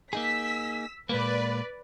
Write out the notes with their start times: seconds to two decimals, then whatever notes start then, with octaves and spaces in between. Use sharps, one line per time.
0.13 A#3 D#4 G#4 E6 B6
1.09 A#2 G#3 A#3 B4 D5